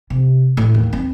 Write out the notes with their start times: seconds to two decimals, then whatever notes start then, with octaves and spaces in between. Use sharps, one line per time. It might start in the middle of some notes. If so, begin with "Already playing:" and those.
0.10 C3
0.57 A2
0.74 D#2
0.93 C4